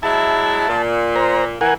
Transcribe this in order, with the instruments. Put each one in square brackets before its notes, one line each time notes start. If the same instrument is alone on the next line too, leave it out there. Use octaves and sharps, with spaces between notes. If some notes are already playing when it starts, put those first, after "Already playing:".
[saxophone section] F#3 G#3 E4 [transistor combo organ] A5
[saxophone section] A#2
[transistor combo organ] C5 A#5
[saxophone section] E3 [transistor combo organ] A#4 F#5 G#5